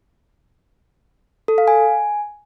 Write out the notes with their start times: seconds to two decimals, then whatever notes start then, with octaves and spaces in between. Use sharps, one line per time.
1.48 A4
1.58 F5
1.68 G#5